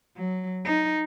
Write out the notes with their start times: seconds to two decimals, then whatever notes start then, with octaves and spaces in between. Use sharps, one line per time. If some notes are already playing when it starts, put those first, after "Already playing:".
0.17 F#3
0.65 D#4